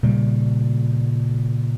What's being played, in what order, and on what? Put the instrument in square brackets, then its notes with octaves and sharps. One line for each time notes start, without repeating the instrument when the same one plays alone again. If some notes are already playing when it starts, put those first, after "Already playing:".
[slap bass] A#2 C#3 G3